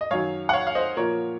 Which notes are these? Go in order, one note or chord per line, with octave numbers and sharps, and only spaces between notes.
D#5
F#2 D#3 F#3 C#5 F5
F#5
C#5 F5
F5
C5 D#5
A#2 F3 A#4 C#5